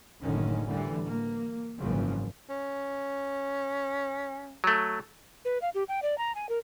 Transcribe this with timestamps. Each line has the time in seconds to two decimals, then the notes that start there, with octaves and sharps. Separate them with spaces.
0.22 F#1 A2 D3 D#3 C#4
0.65 A2 D3 E3 G3
1.05 A#3
1.79 G#1 F#2 A#2 C#3 E3 F3
2.50 C#4
4.64 F#3 A3
5.45 B4
5.62 F5
5.75 G4
5.88 G5
6.02 D5
6.18 A#5
6.35 G#5
6.49 A#4